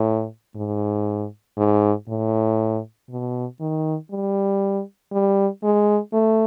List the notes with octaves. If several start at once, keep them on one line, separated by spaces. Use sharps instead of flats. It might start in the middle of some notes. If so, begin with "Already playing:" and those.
Already playing: A2
G#2
G#2
A2
B2
D#3
G3
G3
G#3
A3